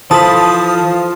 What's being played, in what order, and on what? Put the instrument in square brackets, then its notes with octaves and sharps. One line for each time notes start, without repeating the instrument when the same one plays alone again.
[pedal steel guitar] E3 A4 B5 [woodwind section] F3 [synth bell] A5 D#6